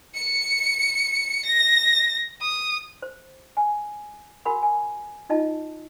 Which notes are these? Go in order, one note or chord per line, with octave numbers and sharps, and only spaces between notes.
C#7
A#6
D#6
C5
G#5
F#4 A#4 F#5 G#5 B5
G#5
D#4 F4 D#5 A5